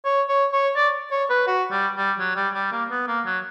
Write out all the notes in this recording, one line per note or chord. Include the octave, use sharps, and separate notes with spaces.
C#5
C#5
C#5
D5
C#5
B4
F#4
G3
G3
F#3
G3
G3
A#3
B3
A#3
F#3